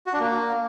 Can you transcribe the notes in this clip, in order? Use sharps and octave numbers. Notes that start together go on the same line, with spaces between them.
F#4
D4
A#3